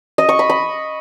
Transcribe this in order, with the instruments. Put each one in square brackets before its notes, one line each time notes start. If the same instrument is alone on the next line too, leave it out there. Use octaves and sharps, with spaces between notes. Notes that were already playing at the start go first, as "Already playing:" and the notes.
[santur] D#5
C#6
B5
B5